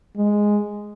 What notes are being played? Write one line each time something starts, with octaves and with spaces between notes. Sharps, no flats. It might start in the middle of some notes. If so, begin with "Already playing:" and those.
G#3